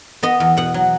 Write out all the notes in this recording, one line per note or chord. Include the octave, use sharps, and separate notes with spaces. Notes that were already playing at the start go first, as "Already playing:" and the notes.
B3 D#5
E2
B2 F#5
F#3